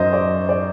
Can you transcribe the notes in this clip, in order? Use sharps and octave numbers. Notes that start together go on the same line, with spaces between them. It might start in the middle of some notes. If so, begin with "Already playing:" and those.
Already playing: F#2 F#3 C5 D#5
D5
D5